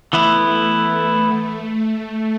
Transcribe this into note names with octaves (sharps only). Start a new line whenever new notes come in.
E3 A3 B3 E4